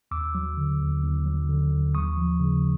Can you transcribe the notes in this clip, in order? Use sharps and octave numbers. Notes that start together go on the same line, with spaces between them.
D#2 D6 E6
F#3
D3
D#2
D#2
F#3
D3
D#2
D#2 C#6 D#6
F3
C#3